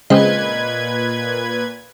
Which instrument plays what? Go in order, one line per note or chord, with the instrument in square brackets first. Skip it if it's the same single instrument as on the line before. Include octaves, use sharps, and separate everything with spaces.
[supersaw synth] A#2 B4 G#6 [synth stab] C#3 G#3 C4 [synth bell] D#5